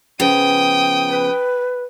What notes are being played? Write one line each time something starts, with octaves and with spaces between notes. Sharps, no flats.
C#3 F3 B3 G5 D#6
B4